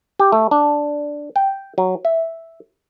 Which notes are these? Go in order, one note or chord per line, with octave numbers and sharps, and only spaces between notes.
G4
A3
D4
G5
F#3
E5